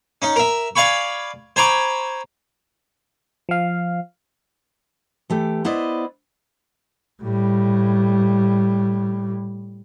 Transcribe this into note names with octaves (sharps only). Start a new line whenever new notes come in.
C#4 D#4
A#4 E5
D5 F5 G#5 B5 C#6
C5 G#5 A#5 B5 C#6 D6
F3 F5
E3 A3 G4
B3 E4 C5 D5 D#5
A2 G3